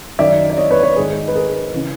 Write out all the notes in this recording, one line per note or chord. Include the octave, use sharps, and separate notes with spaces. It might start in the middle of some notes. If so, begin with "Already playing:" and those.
F#2 D#3 D5 E5
D5
C#5 D#5
B4 C#5
D5
B4 C#5
G#2 D#3 G#4
B4
G#4 A#4
C#3 E3